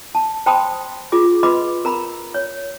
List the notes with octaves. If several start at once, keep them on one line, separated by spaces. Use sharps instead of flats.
A5
C5 G5 A5 B5 C6 D#6
F4 G#4 D6
B4 D#5 B5 C6 D6
A#4 A#5 B5
C#5